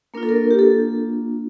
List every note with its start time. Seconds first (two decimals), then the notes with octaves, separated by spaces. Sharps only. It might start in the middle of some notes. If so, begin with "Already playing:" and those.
0.14 A#3 D4 F4 A#4
0.23 A4
0.29 A#4
0.51 G4
0.59 A4